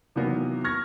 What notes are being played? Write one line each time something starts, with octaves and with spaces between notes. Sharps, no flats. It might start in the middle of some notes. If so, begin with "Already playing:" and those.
C3 D#3 E3 F#3 A#3 B3
C#6 F6 G#6 A#6